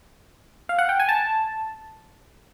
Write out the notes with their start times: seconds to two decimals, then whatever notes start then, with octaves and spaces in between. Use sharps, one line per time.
0.69 F5
0.79 F#5
0.89 G5
1.00 G#5
1.09 A5